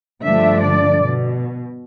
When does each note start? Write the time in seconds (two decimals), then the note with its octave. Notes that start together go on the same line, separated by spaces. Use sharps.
0.22 G2 D3 F3 A3 D4 E5
0.61 D5
0.99 B2